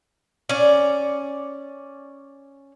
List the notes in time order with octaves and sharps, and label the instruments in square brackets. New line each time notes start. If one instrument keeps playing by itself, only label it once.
[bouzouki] C#4 D5